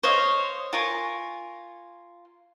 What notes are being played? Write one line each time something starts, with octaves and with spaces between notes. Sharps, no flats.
C5 C#5 D#5 F5
F4 A#4 G#5 C#6